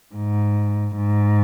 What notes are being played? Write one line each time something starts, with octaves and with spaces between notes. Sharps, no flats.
G#2
G#2